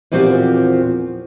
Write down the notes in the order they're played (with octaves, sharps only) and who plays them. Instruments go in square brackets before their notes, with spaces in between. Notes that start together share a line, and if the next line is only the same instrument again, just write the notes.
[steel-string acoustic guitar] E2 A#2 F3 C4 F#4 G4